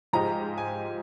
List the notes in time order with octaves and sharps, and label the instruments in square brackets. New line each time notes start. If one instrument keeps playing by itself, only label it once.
[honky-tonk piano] G#2 F3 G#3 D#4 G4 [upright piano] A#5
[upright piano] G#5